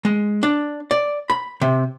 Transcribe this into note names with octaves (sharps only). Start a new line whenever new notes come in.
G#3
D4
D5
B5
C3